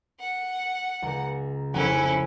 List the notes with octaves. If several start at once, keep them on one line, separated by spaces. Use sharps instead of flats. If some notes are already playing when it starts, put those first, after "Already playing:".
F#5
C#2 A#5
F1 C#4 E4 F#5 G#5